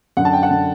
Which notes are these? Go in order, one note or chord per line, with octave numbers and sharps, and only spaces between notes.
F#2 D3 F#5
A5
G5
F#5
D3